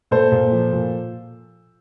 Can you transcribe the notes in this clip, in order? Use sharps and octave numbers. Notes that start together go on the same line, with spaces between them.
A#2 A4 C5
A#2
F3
A#2